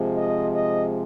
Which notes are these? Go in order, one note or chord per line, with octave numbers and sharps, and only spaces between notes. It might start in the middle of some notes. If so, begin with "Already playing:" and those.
Already playing: C3 F3 G#3
D#5
D#5